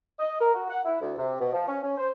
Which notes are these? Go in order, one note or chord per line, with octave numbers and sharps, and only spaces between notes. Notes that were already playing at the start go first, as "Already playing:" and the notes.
D#5
A#4
F#4
F#5
E4
D2
C3
B2
F3
C#4
C#4
C5